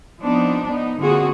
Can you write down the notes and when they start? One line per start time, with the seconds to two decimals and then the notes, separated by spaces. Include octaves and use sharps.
0.21 F3 B3 C4 D4 D#4
0.66 B3 D#4
0.99 D3 A#3 C4 F4 F#4 G#4